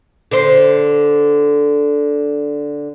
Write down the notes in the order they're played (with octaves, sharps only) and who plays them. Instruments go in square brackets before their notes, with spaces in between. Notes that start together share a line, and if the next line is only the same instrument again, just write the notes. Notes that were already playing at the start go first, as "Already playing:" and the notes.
[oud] D3 C5